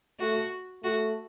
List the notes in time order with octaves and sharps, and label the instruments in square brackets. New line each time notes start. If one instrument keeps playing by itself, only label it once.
[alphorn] A3 [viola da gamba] F#4
[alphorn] A3 [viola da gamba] F#4